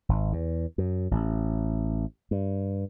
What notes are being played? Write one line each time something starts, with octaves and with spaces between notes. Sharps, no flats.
G#1
E2
F#2
A1
G2